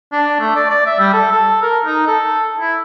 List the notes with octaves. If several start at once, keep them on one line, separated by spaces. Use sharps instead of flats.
D4
A3
D5
D5
E5
G3
A4
A4
A#4
D#4
A4
E4